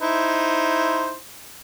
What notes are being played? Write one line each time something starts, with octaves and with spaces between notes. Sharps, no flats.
D#4 E4 C5